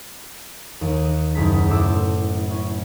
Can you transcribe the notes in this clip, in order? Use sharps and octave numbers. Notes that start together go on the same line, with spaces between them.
D#2
D#4
F#1 D#4 G#4 A#5 B6
F#1 A2 C5 D6 E6
C#4